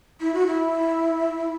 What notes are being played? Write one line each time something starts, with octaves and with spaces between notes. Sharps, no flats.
E4
F#4
E4